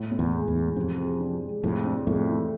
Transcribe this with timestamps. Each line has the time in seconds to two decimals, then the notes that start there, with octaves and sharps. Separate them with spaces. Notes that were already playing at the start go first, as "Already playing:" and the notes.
Already playing: A2
0.12 A2
0.19 E2
0.33 G#3
0.48 E2
0.55 E3
0.76 F2 C3
0.98 G#4
1.20 D4
1.42 G#3
1.64 F2 A2 C3
1.85 D4
2.07 F2 A2 A3
2.29 E3